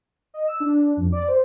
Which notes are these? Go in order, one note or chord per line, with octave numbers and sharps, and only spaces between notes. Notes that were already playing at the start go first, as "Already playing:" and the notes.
D#5
E6
D4
F2
D5
C5